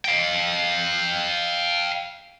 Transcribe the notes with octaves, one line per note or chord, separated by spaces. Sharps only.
F5 G5